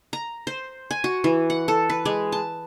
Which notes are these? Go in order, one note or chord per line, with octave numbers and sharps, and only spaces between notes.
A#5
C5
G#5
F#4
E3
F#5
A4
B4
G#3
A5